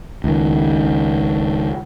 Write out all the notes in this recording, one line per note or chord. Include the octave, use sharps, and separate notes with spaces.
C#2 D#3